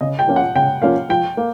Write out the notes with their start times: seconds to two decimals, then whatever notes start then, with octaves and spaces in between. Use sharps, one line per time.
0.01 C#3 D#5
0.19 G5
0.28 F3 A#3 C#4 F4
0.36 F#5
0.55 C#3 G5
0.82 F3 A#3 C#4 F4 F5
1.09 F3 G5
1.37 A#3